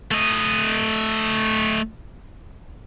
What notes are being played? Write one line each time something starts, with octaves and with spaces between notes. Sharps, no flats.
A3 D#5